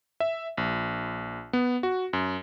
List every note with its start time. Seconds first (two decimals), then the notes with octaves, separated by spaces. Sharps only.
0.20 E5
0.57 A#1
1.53 B3
1.83 F#4
2.13 F#2